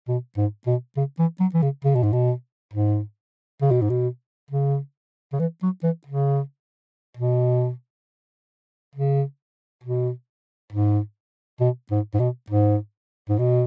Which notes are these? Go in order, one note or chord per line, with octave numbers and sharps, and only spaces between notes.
B2
G#2
B2
C#3
E3
F#3
E3
C#3
C#3
B2
G#2
B2
G#2
C#3
B2
G#2
B2
C#3
C#3
E3
F#3
E3
C#3
B2
C#3
B2
G#2
B2
G#2
G#2
B2
G#2
G#2
B2